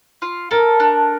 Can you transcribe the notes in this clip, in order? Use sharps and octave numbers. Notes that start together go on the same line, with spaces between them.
F4
A4 A#4
D4